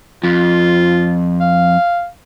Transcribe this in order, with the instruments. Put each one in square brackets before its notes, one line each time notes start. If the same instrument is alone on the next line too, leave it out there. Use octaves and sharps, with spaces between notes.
[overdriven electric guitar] F2 [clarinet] F4
[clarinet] F5